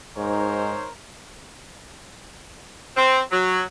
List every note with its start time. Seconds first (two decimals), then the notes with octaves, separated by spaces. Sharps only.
0.17 G#2 D#4 A#4 C5 C#5
2.96 C4
3.32 F#3